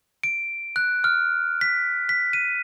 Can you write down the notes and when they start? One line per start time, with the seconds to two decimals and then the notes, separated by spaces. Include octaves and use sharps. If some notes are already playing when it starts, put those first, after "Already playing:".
0.24 D7
0.76 F#6
1.04 F6
1.61 B6
2.09 B6
2.33 D#7